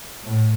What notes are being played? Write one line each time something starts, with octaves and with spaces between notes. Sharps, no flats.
A2